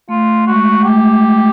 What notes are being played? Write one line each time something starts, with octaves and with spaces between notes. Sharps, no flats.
A3 F4
G#3 F#4
A3 G4